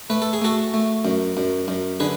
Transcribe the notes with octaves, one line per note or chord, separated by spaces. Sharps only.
A3 B4
A4
G#4
A3 F#4 A4
A3
F#2
F#2
F#2
D3 G#4 B4